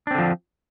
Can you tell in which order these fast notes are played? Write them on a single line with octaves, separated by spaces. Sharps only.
D4 C4 D3 F3